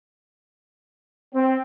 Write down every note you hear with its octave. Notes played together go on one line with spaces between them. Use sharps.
C4